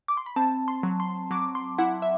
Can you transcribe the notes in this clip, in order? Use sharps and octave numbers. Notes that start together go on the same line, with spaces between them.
D6
C6
B5
C4 A5
C6
F#3
C6
F#3 D6
C6
E4 F#5
E5